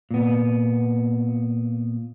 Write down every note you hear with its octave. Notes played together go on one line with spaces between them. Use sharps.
A#2 B3